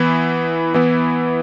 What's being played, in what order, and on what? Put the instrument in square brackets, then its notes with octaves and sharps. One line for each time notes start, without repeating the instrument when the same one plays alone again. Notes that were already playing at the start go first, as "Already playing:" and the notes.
Already playing: [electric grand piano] E3 B3 E4
E3 B3 E4